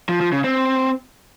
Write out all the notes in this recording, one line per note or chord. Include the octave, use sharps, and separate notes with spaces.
F3
F3
C#3
C4